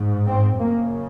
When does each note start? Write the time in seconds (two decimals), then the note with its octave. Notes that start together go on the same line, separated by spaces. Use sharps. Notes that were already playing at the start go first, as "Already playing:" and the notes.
Already playing: G#2
0.27 C4
0.59 F#2 C#3 A#3